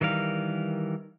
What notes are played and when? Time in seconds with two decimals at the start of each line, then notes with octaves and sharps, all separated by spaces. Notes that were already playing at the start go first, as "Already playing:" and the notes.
0.01 D#3 E3 G3 A#4 F5